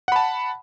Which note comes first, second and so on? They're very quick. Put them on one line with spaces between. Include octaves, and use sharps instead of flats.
F#5 B5 A5